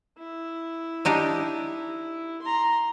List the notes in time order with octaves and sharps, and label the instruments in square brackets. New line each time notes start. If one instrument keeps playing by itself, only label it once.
[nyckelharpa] E4
[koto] D4 D#4 G4
[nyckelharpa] A#5 C6